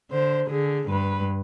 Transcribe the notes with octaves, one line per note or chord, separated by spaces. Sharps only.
D3 C5
D3 G#4
G2 B4